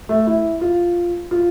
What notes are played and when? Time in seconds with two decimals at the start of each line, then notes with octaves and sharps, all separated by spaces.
0.09 A3
0.27 E4
0.61 F4
1.31 F4